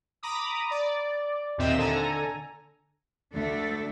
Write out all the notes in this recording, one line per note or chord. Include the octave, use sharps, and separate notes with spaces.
A#5 B5 D6 D#6
D5
D#2 A#2 C4 D#5 E5 E7
D3 A4 G#5 A#5
D2 A3 D4 A4